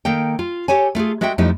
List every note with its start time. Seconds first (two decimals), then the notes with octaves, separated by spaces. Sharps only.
0.05 D#3 A#3 A4 G5
0.39 F4
0.68 G4 A4 C#5 G#5
0.95 A3 F4 F#4 G#4
1.21 G#3 F#4 A4 E5 G5
1.38 F2 F3 G3 A3 D#4 E4